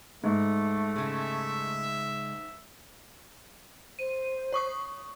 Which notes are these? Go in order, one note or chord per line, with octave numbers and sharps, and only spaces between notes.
G#2 A3
C#3 G#3 E5
C5 D#7
C#5 C#6 D#6